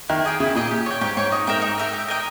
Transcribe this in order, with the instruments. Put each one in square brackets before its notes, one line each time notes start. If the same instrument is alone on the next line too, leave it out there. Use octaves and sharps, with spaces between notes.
[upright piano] D#3 [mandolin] E4
[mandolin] G#4 D#5 G5
[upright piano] C#3 [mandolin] E4
[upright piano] A#2 [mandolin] G#4 D#5 G5
[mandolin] G4
C#5 G5
[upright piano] G#2 [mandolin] G4
[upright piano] G#2 [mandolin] C#5
[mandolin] G5
D#4
[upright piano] G#2 [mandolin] A#4 E5 G5
[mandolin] D#4
A#4 E5 G5
G4
A#4 D#5 G5